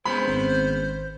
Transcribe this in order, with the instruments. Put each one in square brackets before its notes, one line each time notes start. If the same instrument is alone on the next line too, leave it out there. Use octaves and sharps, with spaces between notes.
[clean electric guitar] G#3 B3 C#4 [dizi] C5 [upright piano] B5
[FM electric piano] G#1 D#3 C4